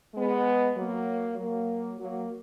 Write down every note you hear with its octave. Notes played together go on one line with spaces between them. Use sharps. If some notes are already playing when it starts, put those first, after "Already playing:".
G#3 B3
F#3 A#3
F#3 A#3
F#3 A#3